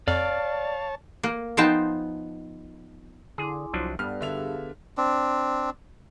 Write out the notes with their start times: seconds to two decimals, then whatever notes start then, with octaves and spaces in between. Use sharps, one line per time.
0.08 F2 C#5 D5 F5 A5
1.23 A#3
1.57 F3 B3 D#4 C5 G5 A5
3.38 D3 E4 G#4 C6 D6
3.73 C2 F3 F#3 D4
3.99 G2 B3 A4 D5 F6
4.21 D3 G4 G#4 E5 F5 F7
4.97 C4 D4